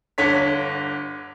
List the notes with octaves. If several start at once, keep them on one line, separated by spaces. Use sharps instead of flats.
G1 D3 C#5 B6